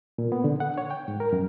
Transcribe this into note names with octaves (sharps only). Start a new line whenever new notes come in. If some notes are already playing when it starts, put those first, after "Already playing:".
A#2
B3
D3
F#5
C#5
G5
G#2
A#4
F#2